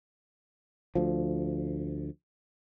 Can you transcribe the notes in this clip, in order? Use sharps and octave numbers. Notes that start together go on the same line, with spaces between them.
D2 F3